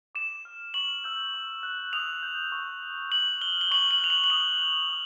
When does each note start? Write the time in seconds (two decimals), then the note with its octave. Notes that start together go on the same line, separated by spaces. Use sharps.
0.15 D6 E7
0.45 F6
0.74 C#6 F#7
1.04 E6 G6
1.34 C#6
1.63 F#6
1.93 D#6 F7
2.23 G6
2.52 C#6
2.83 F#6
3.12 C#6 F#7
3.41 F6 G7
3.61 G7
3.71 C#6 F#7
3.91 F#7
4.00 F#6 F7
4.10 F#7
4.24 F#7
4.30 D#6 F7
4.60 F#6
4.90 D#6